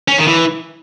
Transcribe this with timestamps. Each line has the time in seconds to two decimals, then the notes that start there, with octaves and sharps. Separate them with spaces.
0.08 C#4
0.18 D#3
0.28 E3